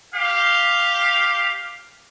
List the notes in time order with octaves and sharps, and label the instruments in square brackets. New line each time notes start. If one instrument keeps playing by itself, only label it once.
[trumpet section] G4 F5